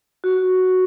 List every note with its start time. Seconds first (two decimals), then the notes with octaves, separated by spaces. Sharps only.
0.24 F#4